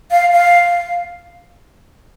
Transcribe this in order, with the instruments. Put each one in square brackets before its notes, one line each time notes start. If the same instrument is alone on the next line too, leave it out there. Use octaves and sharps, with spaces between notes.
[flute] F5
F5